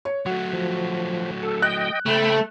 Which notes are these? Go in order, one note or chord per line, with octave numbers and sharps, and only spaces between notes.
C#5
F#3 A3 F#4
F3
A4
D#5 G5 F#6
C#3 A3 C5 G5 B5